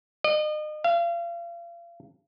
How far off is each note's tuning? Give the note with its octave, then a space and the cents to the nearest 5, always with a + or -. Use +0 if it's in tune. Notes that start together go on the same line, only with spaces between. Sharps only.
D#5 -35
F5 -35